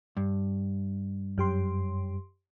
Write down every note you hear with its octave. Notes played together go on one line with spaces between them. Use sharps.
G2
F#2 G4 C6